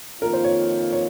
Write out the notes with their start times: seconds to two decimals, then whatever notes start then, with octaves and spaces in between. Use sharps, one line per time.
0.21 F2 D#3 A#3 F4 A#4
0.33 C5
0.44 C#5
0.93 C#5